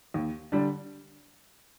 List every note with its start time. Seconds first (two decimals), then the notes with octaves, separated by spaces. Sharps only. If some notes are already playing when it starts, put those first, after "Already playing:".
0.14 D#2
0.52 D3 G3 D4